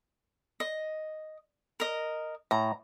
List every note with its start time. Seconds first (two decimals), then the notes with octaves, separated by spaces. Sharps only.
0.60 D#5
1.80 A#4 D#5
2.51 A2 A#5